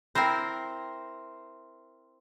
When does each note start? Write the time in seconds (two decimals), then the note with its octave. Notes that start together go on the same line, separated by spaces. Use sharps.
0.15 C4 E4 A#4 C5